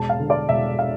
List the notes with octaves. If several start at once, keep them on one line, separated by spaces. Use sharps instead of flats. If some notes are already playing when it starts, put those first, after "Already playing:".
Already playing: E1 A5
F5
D3
D5
E1 E5
F5